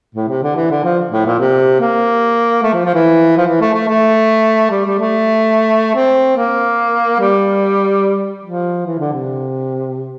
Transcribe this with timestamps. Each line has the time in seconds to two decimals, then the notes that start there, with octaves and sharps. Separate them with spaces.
0.15 A2
0.28 C3
0.43 D3
0.56 E3
0.70 D3
0.84 F3
1.12 A2
1.25 A#2
1.40 C3
1.80 A#3
2.63 A3
2.73 F3
2.85 F3
2.94 E3
3.37 F3
3.47 E3
3.61 A3
3.73 A3
3.88 A3
4.70 G3
4.85 G3
4.99 A3
5.95 C4
6.36 A#3
7.19 G3
8.44 F3
8.86 E3
8.99 D3
9.13 C3